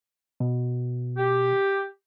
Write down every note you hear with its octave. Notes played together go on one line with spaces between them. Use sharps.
B2
G4